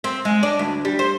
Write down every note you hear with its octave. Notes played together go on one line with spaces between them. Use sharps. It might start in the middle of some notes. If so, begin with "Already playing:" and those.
C4
G#3
D4
D2
G3
C5